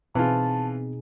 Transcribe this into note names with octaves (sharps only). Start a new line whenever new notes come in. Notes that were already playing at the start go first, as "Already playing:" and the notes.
B2 E3 C4 D#4 F4 G#4 A5